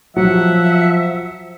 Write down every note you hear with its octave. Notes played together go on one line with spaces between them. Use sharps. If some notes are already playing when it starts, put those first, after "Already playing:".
F3 F#3 E5 F#5